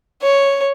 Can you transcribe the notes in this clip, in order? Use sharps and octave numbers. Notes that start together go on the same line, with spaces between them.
C#5